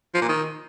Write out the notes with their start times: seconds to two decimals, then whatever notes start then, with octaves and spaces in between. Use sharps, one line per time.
0.15 F3
0.22 A#2
0.29 D#3